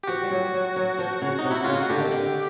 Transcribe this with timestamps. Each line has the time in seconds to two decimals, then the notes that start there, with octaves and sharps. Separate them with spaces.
0.03 G4
0.08 F3 F#4
0.23 G3
0.31 F#3
0.54 F#3
0.76 F#3
0.99 F3
1.21 C#3
1.39 D#4
1.44 C3
1.51 E4
1.64 C#3 F4
1.77 F#4
1.89 D3 G4
2.00 D#3
2.11 D3